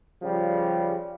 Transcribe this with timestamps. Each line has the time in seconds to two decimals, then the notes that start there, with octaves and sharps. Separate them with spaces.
0.22 C#3 F3 G3